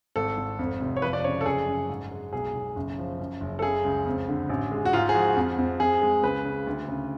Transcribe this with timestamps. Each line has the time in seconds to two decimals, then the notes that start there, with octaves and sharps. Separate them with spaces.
0.16 G#1 A4
0.37 G#1
0.59 F2
0.81 F1
0.96 C#5
1.02 F3 B4
1.13 D5
1.24 C#3 C#5
1.41 A4
1.46 F#1 G#4
1.67 F#2
1.89 G#2
2.11 G#3
2.33 B1 G#4
2.55 B1
2.76 F#1
2.98 F3
3.19 F#2
3.41 F#1
3.59 A4
3.62 C#3 G#4
3.84 C#2
4.06 F2
4.28 D3
4.49 A1
4.72 G#3
4.85 F#4
4.93 G#2 F4
5.09 G#4
5.15 F3 F#4
5.36 F2
5.58 F2
5.80 F2 G#4
6.02 G#3
6.23 C#2 B4
6.45 C#3
6.67 D2
6.88 C#3